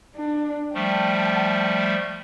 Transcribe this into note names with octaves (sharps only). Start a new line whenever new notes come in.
D4
F3 G3 A3 G5 A5